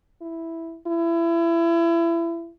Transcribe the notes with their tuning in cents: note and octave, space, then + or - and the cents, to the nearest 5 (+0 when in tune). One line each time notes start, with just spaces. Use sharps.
E4 +0
E4 +30